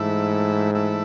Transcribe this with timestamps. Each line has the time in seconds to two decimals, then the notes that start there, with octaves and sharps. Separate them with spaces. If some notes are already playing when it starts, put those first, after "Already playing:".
Already playing: G#2 E3 A3 E4
0.75 E3 A3 E4